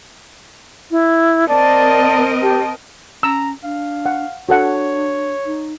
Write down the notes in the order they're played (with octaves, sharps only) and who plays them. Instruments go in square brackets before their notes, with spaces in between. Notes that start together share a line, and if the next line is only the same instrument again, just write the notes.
[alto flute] E4
[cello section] C4 A#4 D#5 [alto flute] D5 [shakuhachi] A5
[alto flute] G4 [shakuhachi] A5
[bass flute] C#4 [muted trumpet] A#5 [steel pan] E6
[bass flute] D4 [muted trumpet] F5
[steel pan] F#5
[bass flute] D4 [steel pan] F#4 A4 F#5 [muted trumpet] C#5
[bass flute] D#4